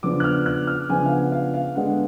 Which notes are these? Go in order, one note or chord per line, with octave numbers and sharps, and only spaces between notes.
C#3 F3 B3 D4 D6
F#6
F6
F#6
F6
C#3 F3 B3 D4 G#5
F5
F#5
F5
F5
D3 G#3 B3 D4 F#5